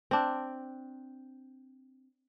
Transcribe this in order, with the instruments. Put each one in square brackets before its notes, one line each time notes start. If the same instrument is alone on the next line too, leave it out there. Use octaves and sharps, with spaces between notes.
[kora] C4 D4